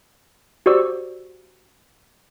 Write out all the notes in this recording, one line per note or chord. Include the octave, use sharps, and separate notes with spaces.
F#4 G4 C5 D5 C#6 E6